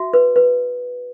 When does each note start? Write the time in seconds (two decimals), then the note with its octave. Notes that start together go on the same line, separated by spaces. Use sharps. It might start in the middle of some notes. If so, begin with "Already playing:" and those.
Already playing: F#4 E5
0.14 B4
0.36 B4